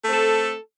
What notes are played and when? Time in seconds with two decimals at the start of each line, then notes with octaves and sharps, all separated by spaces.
0.04 A3
0.08 C4
0.13 A4